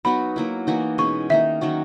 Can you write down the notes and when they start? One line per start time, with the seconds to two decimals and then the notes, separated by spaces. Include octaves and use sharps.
0.05 F#3 B3 D#4 F#4 B5
0.36 F#3 A#3 E4
0.67 E3 A#3 D#4 F#4
0.98 B2 G#3 C#4 G#4 C#6
1.30 D#3 A#3 D#4 E5
1.61 D#3 F#3 C#4 F#4